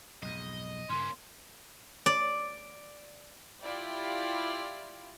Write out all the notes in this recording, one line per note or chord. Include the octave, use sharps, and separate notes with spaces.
B1 F2 G#2 D#5
G2 C#3 A#3 C#4 C6
D5
E4 F4 G4 D5